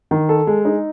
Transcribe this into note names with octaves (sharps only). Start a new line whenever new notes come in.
D#3
A4
G#3
D#4